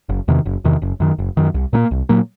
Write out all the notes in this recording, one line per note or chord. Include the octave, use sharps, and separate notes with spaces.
F#1
E2 C3 D#3
F#1
E2 C3 D#3
F#1
F#2 D#3
F#1
F#2 D#3
C2
A#2 F#3 A#3
C2
A#2 F#3 A#3